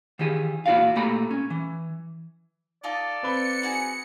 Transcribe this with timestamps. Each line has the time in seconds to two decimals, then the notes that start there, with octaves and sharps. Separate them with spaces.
0.19 D#3 E3 G4 G#4
0.66 A#2 E4 F#4 D5 F5
0.96 A#2 A3 G4 A#5 B5
1.31 C#4
1.50 E3
2.84 D#4 F4 A4 D5
3.23 C4 B4 C#7 G7
3.62 D#4 F#4 G#4